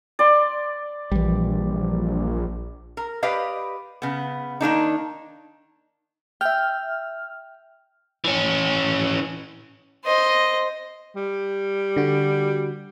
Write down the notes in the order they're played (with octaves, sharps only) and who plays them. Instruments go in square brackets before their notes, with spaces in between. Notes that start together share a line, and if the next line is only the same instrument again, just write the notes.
[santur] D5 C6
[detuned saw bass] A#1 [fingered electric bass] E3 G3
[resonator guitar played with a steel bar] A#4
G4 B4 D5 D#5 F5
C#3 B3
D#3 A#3 D4 D#4
[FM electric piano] E5 F6 [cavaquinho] G5
[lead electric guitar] E3 C#4
[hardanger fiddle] C5 D#5
[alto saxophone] G3
[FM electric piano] D3 F#4